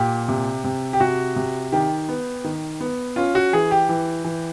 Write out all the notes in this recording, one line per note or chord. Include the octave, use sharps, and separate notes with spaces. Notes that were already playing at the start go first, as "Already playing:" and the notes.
Already playing: A#2 G4
C3
C3
G4
C3 F#4
C3
D#3 G4
B3
D#3
B3
C#4 F4
F#4
E3 G#4
G4
E3
E3